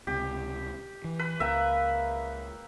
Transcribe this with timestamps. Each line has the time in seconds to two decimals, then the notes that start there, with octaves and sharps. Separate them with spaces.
0.07 C#2 C3 G4
1.04 E3
1.19 B4
1.40 C#2 A#3 E5 G5 A#5